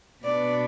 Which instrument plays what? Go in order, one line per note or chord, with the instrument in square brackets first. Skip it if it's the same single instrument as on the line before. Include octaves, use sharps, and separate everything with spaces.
[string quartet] B2 B3 D4 D5